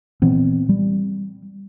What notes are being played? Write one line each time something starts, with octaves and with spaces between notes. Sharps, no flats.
A#2 E3 B3 C4
G3